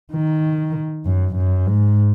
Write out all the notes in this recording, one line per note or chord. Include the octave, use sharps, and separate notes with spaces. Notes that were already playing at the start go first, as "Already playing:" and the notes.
D#3
F#2
F#2
G#2